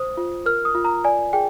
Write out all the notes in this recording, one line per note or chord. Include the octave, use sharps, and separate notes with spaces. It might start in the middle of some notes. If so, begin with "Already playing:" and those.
Already playing: C5 D#6
F4
A#4 F6
D#6
F4
A#5
D5 G#5
G#4 G5